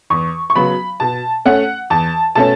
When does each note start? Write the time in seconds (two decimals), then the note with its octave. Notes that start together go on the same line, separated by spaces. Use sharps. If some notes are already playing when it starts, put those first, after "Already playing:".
0.10 E2 C#6
0.50 C#6
0.56 C#3 F#3 B3 B5
1.00 B2 A5
1.45 A3 C#4 F#5
1.90 E2 A5
2.35 B2 A3 C#4 A5